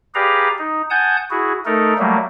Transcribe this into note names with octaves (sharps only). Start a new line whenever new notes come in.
G4 G#4 B4 D5 F5 A#5
D#4
F#5 G#5 A5 D#6 G6
E4 F#4 G#4
A3 D#4 A4 A#4
F#3 G3 A3 A#3